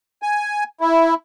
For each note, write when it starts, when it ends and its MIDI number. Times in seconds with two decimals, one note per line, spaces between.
0.22 0.64 80
0.81 1.14 64